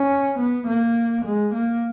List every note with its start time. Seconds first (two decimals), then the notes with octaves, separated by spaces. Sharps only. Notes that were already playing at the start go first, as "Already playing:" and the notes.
Already playing: C#4
0.39 B3
0.67 A#3
1.25 G#3
1.54 A#3